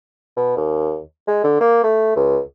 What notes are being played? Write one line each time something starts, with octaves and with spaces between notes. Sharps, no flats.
B2
D#2
G#3
D3
A#3
A3
C#2